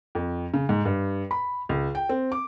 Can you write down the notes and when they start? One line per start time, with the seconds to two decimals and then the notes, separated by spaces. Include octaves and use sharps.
0.15 F2
0.54 C#3
0.69 G#2
0.85 G2
1.31 B5
1.69 C#2
1.95 G5
2.09 C4
2.32 D6